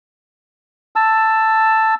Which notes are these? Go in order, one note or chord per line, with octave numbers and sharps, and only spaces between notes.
A5 E6